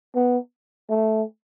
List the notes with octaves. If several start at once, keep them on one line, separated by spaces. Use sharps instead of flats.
B3
A3